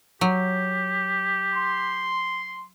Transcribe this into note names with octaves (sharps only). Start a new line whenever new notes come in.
F#3 G4
C6